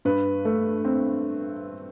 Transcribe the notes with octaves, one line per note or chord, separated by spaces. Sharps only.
G2 B4
A3
C4